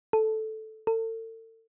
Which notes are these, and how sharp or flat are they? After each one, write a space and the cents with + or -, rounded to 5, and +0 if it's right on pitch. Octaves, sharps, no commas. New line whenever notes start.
A4 -5
A4 +40